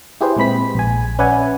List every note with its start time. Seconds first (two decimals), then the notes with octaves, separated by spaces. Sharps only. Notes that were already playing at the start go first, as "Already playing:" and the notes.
0.21 E4 G4 G#4 B4 C5
0.36 A#2 G#3 C4 B5 B6
0.75 A#1 G#5
1.19 C#4 B4 D5 E5 F#5 G#5